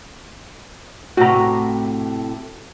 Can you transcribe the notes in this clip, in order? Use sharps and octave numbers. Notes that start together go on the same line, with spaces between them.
A2 C3 F#4 A#5